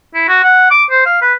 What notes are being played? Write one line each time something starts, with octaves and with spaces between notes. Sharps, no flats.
E4
F#4
F#5
D6
C5
F5
B4